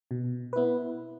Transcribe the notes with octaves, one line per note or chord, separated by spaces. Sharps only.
B2
B3 E4 B4